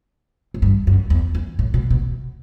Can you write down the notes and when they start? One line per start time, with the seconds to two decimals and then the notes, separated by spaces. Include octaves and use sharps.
0.54 A2
0.62 G2
0.87 F#2
1.10 E2
1.35 E2
1.59 A2
1.74 B2
1.90 B2